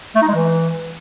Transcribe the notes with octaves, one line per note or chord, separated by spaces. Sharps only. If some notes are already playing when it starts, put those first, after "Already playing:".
A3
D#4
G#3
E3